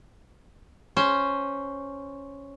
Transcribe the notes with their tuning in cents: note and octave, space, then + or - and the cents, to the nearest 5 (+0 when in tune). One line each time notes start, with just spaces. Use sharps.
C#4 +0 C5 +0